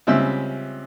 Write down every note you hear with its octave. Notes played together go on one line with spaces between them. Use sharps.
C#2 G3 C4 C#4 E5 E6